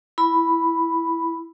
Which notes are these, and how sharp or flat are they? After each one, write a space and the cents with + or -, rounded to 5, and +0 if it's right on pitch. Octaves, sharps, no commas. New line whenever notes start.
E4 +5 B5 +0